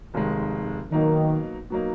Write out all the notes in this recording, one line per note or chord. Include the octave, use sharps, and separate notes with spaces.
F1 D#2 D#3 G#3
B2 D#3 F#3 A#3 D#4
B2 F#3 A#3 D#4